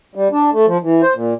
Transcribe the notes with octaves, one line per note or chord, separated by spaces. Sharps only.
G3
D4
A3
F3
E3
C5
A#2